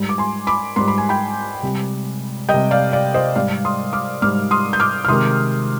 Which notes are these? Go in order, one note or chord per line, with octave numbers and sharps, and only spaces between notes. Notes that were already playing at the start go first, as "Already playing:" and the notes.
Already playing: G#2 G3
D6
G#5 C6
B5 D6
G#2 G3 C6
B5
G#5
G5 B5
C3 G3
G3 D#5 G5
C3
D5 F5
D5 F5
C5 D#5
G#2 G3 D5 F5
C6 D#6
D6 F6
G#2 G3 D6 F6
C6 D#6
G6
D6 F6
F6
C3 D#3 G#3 C6 D#6